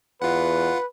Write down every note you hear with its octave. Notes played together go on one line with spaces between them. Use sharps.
E2 F4 B4 F#5